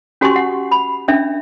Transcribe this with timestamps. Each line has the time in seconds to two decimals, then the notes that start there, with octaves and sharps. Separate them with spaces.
0.21 C#4 F#4 G4 G#5 C6 C#6
0.36 F#5
0.71 B5
1.08 C#4 D4 E5